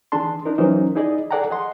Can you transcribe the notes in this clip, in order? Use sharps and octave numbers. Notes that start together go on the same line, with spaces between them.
D#3 E3 D4 G#4 A5 C6
D4 D#4 A#4
E3 F#3 C#4 D#4 A#4 C5
D#4 E4 G#4 D5 D#5
G#4 A4 D5 F#5 G5 A#5
G#4 D#5 F#5 C6